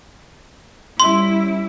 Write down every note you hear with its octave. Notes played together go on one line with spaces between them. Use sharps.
G3 C#4 E4 C6